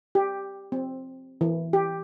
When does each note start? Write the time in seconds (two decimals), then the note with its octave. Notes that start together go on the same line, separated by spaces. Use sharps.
0.15 G4
0.72 C4
1.41 E3
1.73 G4